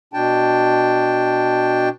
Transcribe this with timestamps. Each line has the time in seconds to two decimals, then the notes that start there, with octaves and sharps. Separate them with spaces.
0.13 B2 D4 G5 A5